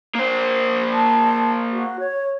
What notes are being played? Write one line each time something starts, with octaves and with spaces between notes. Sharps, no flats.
A#3 C5
A5
F#4
C#5